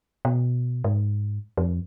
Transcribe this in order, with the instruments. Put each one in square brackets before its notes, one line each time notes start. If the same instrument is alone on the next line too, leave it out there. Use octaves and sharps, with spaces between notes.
[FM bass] B2
G#2
F2